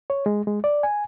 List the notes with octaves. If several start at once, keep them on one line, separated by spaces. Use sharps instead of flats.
C#5
G#3
G#3
D5
G#5